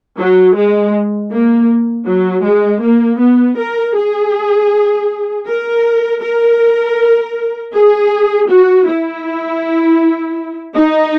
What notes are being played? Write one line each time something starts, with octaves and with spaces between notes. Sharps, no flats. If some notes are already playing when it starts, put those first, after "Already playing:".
F#3
G#3
A#3
F#3
G#3
A#3
B3
A#4
G#4
A#4
A#4
G#4
F#4
E4
D#4